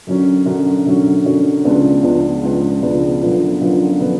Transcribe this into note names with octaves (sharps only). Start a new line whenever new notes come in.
F#2 D3 F#3 C#4
F#2 D3 F#3 C#4
F#2 D3 F#3 C#4
F#2 D3 F#3 C#4
C#2 C#3 F3 B3 D4
C#2 C#3 F3 B3 D4
C#2 C#3 F3 B3 D4
C#2 C#3 F3 B3 D4
F#2 D3 F3 B3 F4
F#2 D3 F3 B3 F4
D3 F3 B3 F4